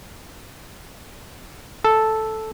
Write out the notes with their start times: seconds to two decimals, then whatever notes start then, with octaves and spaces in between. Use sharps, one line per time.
1.85 A4